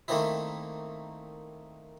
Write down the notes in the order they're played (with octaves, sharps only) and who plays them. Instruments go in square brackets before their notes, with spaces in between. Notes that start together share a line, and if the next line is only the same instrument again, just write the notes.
[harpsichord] D#3 A3 A#3 C4 D#4 E4